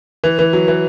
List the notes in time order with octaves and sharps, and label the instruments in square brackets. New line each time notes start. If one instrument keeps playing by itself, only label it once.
[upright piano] E3
E3
F#3
E3